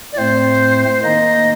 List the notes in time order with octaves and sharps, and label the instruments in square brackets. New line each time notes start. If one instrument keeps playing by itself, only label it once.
[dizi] D5
[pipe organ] A2 A3 C4 [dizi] C5
[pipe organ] D#3 A#3 D#4 [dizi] D#5